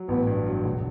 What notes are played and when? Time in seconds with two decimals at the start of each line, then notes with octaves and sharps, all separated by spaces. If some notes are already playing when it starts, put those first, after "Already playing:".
Already playing: F#3
0.08 A1 B3
0.27 G2
0.47 F#3
0.64 E1